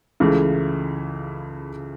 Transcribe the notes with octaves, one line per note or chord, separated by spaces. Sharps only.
C#2 C#3 E3 A3